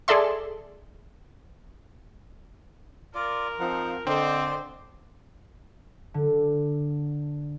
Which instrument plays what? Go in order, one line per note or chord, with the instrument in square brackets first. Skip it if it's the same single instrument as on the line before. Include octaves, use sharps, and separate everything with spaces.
[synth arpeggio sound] G#4 A4 D5 E5 C6
[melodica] F4 D5 [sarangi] A#4
[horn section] F3 C4 [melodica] D#4 F#5
[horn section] D3 D#5 [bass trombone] C4 [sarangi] C5 [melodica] D5 C6
[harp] D3